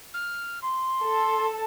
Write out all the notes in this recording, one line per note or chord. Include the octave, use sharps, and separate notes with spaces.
F6
C6
A4